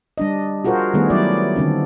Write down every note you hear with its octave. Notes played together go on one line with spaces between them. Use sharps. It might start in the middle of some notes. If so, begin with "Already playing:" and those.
G3 D4 D#5
F4 F#4 G#4 A#4 C5
D#3 G3 A3 B3 G#4
F#3 G3 E4 D5
D3 D#3 C4 D4